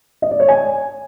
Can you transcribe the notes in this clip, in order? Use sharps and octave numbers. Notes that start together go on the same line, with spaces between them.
D#5
D5
C#5
G#5